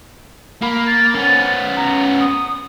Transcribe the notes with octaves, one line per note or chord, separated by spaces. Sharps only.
A#3 B5
A6
B3 C#4
A#5
D#6